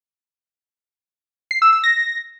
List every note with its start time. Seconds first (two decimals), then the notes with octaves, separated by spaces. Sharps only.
1.51 C7
1.62 E6
1.73 E6
1.84 A#6